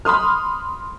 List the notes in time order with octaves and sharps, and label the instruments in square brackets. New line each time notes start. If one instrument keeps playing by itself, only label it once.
[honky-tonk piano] B5 C6 D#6 F6